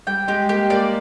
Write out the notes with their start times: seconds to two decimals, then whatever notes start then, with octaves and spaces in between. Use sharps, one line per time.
0.07 G3 G5
0.28 G#3 G4
0.49 A#3 G4
0.70 A#3 D5